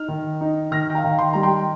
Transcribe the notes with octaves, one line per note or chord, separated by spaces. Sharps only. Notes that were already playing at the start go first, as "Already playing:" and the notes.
Already playing: D#4 F6
D#3
D#4
D#3 F6 A#6
G5
F5 A#5
D#3
G5 C6
G3 A#5
G5 C6